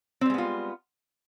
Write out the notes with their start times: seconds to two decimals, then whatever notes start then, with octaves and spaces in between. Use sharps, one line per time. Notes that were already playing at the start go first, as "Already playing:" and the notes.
0.21 C4
0.26 G3
0.30 G#3
0.34 B3
0.38 F4